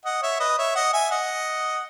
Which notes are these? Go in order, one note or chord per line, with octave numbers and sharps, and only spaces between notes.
D#5 F#5
C#5 E5
B4 D#5
C#5 E5
D#5 F#5
E5 G#5
D#5 F#5